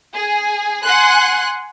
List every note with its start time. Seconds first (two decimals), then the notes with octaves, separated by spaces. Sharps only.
0.14 G#4 G#5
0.83 F#5 G#5 C6 F#6